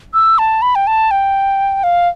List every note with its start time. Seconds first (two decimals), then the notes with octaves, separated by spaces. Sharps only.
0.14 E6
0.38 A5
0.62 B5
0.75 G5
0.87 A5
1.11 G5
1.83 F5